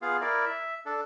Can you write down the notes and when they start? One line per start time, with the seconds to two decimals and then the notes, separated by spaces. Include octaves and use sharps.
0.02 B3 F4 G#4 F5
0.21 E4 A#4 D5
0.45 E5
0.86 D4 A4